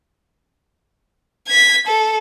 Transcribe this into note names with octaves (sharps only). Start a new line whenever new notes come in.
G#6 B6
A4